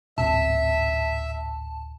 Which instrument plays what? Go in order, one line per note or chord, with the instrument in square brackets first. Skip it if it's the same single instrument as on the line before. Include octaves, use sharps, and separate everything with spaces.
[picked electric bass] D1 G#1 C3 [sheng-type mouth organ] E5 [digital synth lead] A5